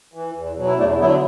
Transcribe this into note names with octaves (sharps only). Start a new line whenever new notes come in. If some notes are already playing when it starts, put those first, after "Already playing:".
E3
E2
B2 F#3
E4
E2 A3 D4
D3 F#3 B3 E4